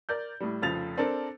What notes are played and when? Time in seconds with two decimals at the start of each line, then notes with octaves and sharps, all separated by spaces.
0.09 A#4 D5 G6
0.40 A2 G3
0.62 F1 C#3 F3 A6 F7
0.97 C4 D4 A4 A#4